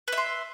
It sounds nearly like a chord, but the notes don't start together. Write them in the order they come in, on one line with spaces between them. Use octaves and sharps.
B4 E5 C6